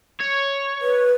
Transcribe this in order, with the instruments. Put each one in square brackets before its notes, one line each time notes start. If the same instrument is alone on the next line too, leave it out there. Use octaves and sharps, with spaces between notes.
[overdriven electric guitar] C#5
[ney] B4